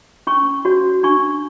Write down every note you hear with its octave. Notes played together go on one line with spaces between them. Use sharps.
C#4 C#6
F#4 C#5
D4 C#6